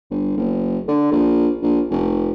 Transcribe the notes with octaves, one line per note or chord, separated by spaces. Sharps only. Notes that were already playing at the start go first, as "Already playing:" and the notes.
G1
F#1
D3
A#1
A#1
F1